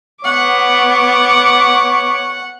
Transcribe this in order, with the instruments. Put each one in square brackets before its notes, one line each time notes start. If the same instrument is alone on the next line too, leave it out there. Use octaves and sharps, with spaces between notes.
[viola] B3 D6 [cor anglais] C#5 [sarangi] F#5